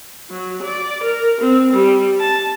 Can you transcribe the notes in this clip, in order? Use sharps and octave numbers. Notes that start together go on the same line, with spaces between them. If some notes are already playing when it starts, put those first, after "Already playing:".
F#3
D5
A#4
C4
G3
A5